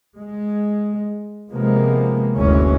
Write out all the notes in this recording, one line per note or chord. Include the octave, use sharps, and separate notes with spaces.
G#3
C3 F3 G#3 A#3 B3
F#1 D2 E3 G#3 C#4